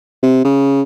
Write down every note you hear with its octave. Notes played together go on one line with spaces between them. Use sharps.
C3
C#3